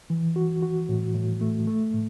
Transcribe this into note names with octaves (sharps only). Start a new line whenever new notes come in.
E3
F#4
F#4
A2
A2
A3
A3
A2